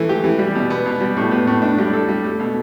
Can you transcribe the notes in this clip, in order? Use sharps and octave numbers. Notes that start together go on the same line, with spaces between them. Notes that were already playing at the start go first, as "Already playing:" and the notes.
Already playing: E3 A3
G4
E3
G3
B2
B3
B2
G3
A2
B3
A2
D4
G3
A4
G3
A3
B2